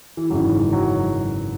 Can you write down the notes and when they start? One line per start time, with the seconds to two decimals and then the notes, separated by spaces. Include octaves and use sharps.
0.17 E3
0.30 G#1 F#2 C#3 E3 F#3
0.73 F#3